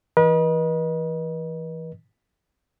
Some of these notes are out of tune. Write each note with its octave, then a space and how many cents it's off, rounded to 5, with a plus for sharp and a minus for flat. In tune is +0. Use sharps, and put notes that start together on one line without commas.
E3 +0 B4 -40 D#5 +0